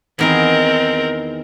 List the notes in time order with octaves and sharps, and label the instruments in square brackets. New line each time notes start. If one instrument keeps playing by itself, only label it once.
[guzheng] E2 D#3 G#4 [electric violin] C4 A#4